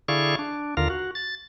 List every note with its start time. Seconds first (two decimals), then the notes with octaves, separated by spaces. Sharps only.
0.08 D3 E4 G#4 D5 F5 C#6
0.39 D4
0.77 D#2 D3 F4 A#4 F5
0.90 F#4
1.15 A6